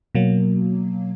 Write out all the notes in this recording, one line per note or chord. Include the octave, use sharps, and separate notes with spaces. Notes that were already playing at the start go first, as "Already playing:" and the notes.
B2 F#3 A#3